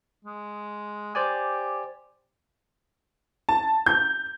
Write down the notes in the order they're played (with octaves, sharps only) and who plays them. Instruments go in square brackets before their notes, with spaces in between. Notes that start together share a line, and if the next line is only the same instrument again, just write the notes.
[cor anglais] G#3
[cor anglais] G4 [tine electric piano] C5 D5 G#5
[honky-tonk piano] A5
G6